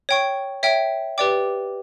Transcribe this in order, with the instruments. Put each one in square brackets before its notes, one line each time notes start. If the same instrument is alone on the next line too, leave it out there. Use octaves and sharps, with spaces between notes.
[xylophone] C#5 G5 C#6
C#5 E5 G5
G4 B4 D5 G5 D6